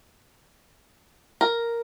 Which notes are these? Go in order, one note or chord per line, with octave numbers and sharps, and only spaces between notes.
A#4